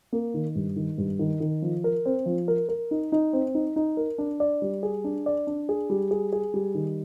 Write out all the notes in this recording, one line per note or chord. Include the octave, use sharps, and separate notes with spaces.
A#3
D#3
G2
D#3
G2
D#3
D#3
F3
A#4
C4
F3
A#4
A#4
D#4
D#4
C4
D#4
D#4
A#4
D4
D5
G3
G#4
D4
D5
D4
G#4
G3
G#4
G#4
G3
D#3